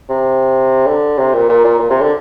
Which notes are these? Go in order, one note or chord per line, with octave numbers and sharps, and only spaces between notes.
C3
D3
C3
A#2
A#2
A#2
A#2
C3
D3